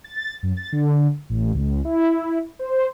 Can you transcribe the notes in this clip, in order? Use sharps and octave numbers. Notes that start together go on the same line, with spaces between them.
A6
F#2
A6
D3
A1
C#2
E4
C5